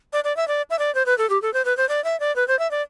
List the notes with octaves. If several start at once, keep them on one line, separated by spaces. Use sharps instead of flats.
D5
D5
E5
D5
E5
D5
C5
B4
A4
G4
A4
C5
B4
C5
D5
E5
D5
B4
C5
E5
D5